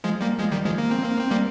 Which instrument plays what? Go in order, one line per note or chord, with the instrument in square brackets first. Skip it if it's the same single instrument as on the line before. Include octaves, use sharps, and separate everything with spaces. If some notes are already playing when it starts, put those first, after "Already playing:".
[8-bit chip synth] F3 G#3
G3 A#3
F3 G#3
D#3 G3
F3 G#3
A#3
C4
A#3
C4
G3 A#3